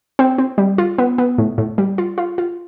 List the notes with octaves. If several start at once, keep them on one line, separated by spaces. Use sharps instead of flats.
C4
C4
G3
F4
B3
B3
A2
A2
G3
F4
F4
F4